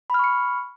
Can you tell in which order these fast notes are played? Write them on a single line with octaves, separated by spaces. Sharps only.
B5 F6 C#6 C#7